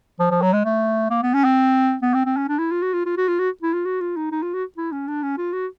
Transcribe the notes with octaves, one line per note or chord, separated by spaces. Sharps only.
F3
F3
F#3
G#3
A3
A#3
B3
C#4
C4
B3
C4
C4
C#4
D4
E4
F4
F#4
F4
F4
F#4
F4
F#4
E4
F4
F#4
F4
D#4
D#4
F4
F#4
E4
C#4
D4
C#4
F4
F#4